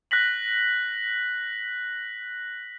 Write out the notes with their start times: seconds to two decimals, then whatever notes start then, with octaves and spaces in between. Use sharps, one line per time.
0.11 F#6 A#6 B6 F#7